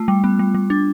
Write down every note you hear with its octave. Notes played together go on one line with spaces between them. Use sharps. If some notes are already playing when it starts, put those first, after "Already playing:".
Already playing: A3 F4
G3
B3
G3
G3
D4